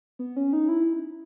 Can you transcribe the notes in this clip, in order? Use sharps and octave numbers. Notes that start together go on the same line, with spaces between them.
B3
C#4
D#4
E4